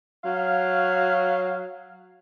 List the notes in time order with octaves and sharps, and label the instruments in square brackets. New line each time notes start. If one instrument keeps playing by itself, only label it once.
[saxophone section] F#3 F5